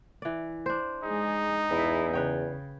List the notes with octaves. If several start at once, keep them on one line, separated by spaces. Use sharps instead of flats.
E3 D5
D4 C5
G#3 D#4 G#4
E2 E4 G#4
C#3 B4 C#5 G5